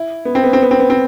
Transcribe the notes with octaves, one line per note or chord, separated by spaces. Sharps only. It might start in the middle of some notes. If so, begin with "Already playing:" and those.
Already playing: E4
B3
C4
B3
C4
B3
C4
B3
C4